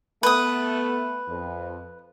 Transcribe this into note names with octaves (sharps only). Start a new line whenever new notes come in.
A3 B3 B4 D#6
F2